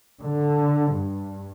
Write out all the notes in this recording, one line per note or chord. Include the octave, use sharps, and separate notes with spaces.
D3
G2